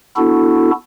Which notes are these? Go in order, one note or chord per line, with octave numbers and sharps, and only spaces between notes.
B3 D4 E4 F#4 A4